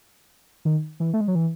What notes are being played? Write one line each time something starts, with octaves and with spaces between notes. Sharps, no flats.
D#3
E3
A3
G#3
F#3
E3